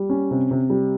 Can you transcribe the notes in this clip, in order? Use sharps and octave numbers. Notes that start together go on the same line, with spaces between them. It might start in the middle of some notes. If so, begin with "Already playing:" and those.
Already playing: G3
C#4
C3
C3
G3